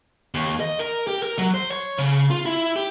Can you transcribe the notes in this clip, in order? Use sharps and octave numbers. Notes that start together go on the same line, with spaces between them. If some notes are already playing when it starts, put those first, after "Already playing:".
D#2
D#5
A#4
G4
A#4
F#3
C5
C#5
C#3
F4
E4
G4